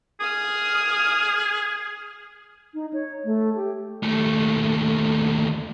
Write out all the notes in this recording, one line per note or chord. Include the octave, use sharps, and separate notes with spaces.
G#4 D#6 F6
D#4
C#5
A3
G4
D#2 A3